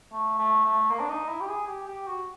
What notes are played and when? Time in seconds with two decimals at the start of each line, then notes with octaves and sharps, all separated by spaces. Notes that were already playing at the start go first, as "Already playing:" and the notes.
0.12 A3
0.38 A3
0.65 A3
0.90 A#3
1.00 D4
1.09 D#4
1.28 E4
1.41 G4
1.48 G#4
1.67 G4
1.87 G4
2.07 F#4